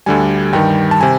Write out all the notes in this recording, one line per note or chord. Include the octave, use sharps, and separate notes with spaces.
D2 D3 G3 G#5
G2 D#3 G3 G5
A5
C3 G#5